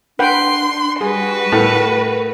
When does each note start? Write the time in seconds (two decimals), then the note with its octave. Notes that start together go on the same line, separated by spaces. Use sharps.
0.19 D4 B4 F#5 G5 C6
1.01 G3 F#4 G#4 B4
1.52 A2 A#4